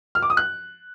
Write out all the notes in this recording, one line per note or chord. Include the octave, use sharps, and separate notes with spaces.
F6
D6
D#6
F#6